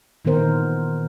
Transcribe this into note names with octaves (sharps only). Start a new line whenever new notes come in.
A#2 D#3 E3 B3 A#4 C5